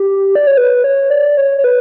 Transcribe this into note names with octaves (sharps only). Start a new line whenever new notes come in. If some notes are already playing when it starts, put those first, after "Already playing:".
Already playing: G4
D5
C#5
B4
C#5
D5
C#5
C#5
B4